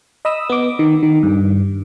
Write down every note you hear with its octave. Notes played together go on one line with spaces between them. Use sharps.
D#5 B5 D#6 E6
B3 D6
D#3
D#3
G2